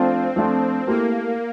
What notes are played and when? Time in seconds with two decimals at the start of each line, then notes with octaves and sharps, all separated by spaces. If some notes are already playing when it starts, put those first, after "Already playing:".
Already playing: F3 A3 C4 D4 F4
0.36 F3 A3 D4 F4
0.87 A3 A#3 E4 G4 A#4